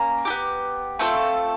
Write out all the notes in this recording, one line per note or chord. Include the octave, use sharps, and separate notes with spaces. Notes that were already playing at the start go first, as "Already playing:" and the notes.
Already playing: A#3 C#4 A#5
B3 E4 G4
A3 C4 F4 A4